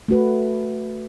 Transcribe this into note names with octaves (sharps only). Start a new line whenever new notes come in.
A3 F#4 B4